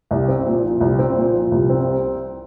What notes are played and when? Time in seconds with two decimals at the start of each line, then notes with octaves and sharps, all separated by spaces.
0.11 C2
0.28 C4
0.46 A#2
0.63 F3
0.81 C2
0.99 C4
1.16 A#2
1.33 F3
1.52 C2
1.69 C4